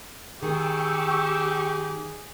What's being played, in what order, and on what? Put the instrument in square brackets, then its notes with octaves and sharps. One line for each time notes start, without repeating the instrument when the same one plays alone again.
[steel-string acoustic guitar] D#3 [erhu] G4 [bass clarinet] G#4 [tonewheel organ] G5 C#6 E6